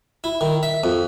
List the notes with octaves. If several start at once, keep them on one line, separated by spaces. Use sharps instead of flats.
E4
D#3
E5
F2